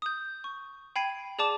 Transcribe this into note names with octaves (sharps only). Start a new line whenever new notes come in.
D#6 G6
C#6
G5 B5 G#6 C7 D#7
G#4 D5 A5 D6 E7